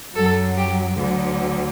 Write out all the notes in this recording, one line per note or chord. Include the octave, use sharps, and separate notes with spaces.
F#2 F#3 A4
G4
D2 D3 F#3